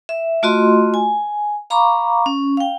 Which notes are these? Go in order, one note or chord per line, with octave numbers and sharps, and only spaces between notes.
E5
A3 F4 F#4 D#5 C6
G#5
F5 A#5 B5 C#6 D6
C#4
F5 G5